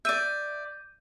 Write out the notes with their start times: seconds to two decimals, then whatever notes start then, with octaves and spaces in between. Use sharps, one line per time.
0.05 D5 E5 G6 D#7